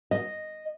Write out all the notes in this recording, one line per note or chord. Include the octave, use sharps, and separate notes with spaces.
D#5